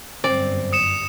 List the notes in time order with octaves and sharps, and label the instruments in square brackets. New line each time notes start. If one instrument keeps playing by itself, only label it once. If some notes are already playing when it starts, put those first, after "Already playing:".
[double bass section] G1 F#2 [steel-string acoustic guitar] C4 [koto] D5
[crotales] D#6 C#7 E7